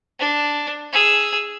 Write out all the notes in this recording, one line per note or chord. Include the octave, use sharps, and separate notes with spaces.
D4
G#4 E6